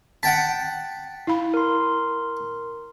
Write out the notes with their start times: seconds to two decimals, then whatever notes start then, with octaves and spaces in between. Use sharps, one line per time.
0.23 F#5 G5 A5 B6
1.27 E4 F5 B5
1.54 A#4 C6